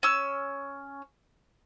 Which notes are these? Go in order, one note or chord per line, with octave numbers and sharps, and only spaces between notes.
C#4 E6